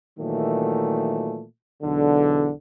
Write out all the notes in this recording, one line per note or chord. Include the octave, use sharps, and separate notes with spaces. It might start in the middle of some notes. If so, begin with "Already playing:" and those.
A#2 D#3 E3 F#3 A3
B1 E2 D3